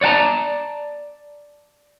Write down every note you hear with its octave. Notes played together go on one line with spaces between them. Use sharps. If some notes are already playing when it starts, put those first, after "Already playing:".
C#5 D5 F#5 A5 A#5